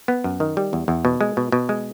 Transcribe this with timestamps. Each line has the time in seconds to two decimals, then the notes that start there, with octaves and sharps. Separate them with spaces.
0.08 B3
0.24 F#2
0.40 D#3
0.57 G3
0.73 E2
0.88 E2
1.05 B2
1.21 G#3
1.37 B2
1.52 B2
1.69 G#3